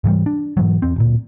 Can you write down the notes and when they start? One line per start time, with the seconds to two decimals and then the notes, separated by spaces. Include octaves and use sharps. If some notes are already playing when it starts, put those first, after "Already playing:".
0.04 G#2 E3 F3 G3
0.26 D4
0.57 G#2 E3 F#3
0.82 E2 C4
0.96 D1 A#2